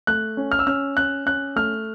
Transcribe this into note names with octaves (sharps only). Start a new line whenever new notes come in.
A3 F#6
C#4
F6
E6
C#4 F6
C#4 F#6
C#4 F#6
A3 F6